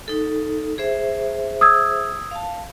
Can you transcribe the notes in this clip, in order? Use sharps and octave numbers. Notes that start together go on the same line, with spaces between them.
D#4 A4
G#4 C5 E5
D#6 E6 G#6
F5 A5